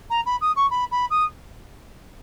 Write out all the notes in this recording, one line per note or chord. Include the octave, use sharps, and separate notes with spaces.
A#5
B5
D#6
C#6
B5
B5
D#6